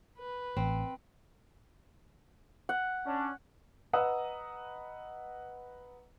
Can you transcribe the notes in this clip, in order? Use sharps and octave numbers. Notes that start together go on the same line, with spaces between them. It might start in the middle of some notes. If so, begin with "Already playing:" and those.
B4
A1 C4
F#5
C#4 D4
B4 D#5 F#5 A#5 D#6 E6